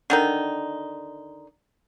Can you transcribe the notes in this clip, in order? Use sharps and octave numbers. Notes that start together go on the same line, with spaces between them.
D3 D#3 D#4